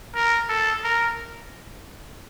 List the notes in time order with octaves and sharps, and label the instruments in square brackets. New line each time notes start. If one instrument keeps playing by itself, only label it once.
[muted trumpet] A#4
A4
A#4